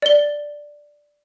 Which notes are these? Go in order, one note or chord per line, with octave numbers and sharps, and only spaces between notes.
D5 G7